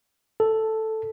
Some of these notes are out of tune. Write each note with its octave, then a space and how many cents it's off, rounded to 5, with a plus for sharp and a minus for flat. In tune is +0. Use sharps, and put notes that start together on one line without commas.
A4 +0